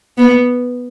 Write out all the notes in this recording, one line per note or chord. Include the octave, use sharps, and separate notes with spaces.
B3